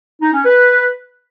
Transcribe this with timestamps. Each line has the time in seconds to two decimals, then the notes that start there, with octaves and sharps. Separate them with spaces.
0.22 D#4
0.34 C#4
0.45 B4